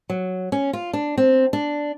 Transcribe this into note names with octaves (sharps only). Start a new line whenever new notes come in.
F#3
C#4
F4
D4
C4
D4